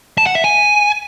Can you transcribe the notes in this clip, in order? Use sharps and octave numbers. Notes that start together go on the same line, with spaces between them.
A5
F#5
E5
G#5